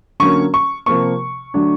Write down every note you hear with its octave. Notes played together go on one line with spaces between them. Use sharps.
D3 F#3 A#3 C#4 C#6
C#6
C3 F3 A#3 C#6
D3 F#3 A3 D4